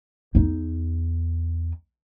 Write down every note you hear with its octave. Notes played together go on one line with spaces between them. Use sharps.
E2 D#4